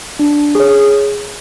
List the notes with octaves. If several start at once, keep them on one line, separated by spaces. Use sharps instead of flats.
D4
G#4 C#5